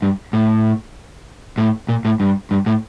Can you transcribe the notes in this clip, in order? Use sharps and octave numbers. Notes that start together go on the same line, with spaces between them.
G2
A2
A2
A#2
A2
G2
G2
A2